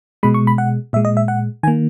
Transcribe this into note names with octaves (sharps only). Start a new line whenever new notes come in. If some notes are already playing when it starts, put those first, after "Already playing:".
B2 G#3 B5
C#6
B5
F#5
A#2 G#3 E5
D#5
E5
F#5
D#3 A#3 G#5